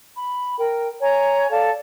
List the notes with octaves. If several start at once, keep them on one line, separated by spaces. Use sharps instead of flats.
B5
A#4 G5
C#5 G#5 A#5
A4 D5 F5 A5